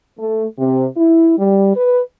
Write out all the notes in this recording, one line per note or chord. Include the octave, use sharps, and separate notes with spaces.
A3
C3
E4
G3
B4